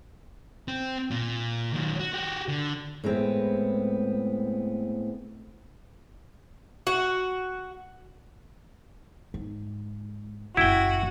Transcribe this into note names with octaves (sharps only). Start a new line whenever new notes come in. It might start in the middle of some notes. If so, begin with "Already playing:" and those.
C4
A#2
D#3 F#3
F#4
F#4 G4
D3
A2 G#3 B3 C4
F#4
G#2
F#1 A#2 E4 F#4 G5